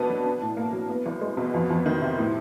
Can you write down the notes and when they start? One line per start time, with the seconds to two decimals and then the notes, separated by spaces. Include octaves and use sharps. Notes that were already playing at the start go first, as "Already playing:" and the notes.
Already playing: B2 B3 D4
0.10 F#3
0.26 D4
0.41 A2
0.57 A#3
0.73 F#3
0.89 B3
1.06 C2
1.21 G#3
1.37 B2
1.54 F2
1.70 F2
1.86 D#3
2.02 C3
2.18 A2